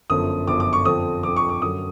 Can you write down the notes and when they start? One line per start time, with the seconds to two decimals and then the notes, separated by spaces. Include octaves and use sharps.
0.09 G1 F#2 D3 F3 D#6
0.47 G1 F#2 D3 F3 D6
0.60 D6
0.73 C#6
0.85 F2 D3 F3 D#6
1.23 F2 D3 F3 D6
1.36 C#6
1.49 D6
1.61 F#2 D3 F#3 D#6